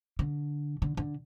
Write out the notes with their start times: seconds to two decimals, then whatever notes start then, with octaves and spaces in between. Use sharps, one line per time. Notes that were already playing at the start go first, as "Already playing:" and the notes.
0.19 D3
0.82 D3
0.97 D3